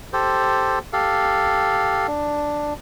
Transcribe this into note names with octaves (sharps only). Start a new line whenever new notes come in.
G4 A4 C5
G4 A4 F5
D4